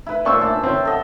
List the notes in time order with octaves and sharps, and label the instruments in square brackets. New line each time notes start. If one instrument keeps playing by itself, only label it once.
[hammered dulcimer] E4 B4
[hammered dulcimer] A#2 C#4 C5 [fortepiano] D5 C#6 E6
[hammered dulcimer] D4 E5 A5
[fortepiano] C4 C#4
[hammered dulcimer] A4 D#5 F#5